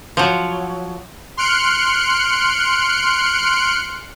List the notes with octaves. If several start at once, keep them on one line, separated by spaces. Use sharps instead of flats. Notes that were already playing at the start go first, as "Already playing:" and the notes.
F3 F#3
C6 F6 F#6 C#7 D7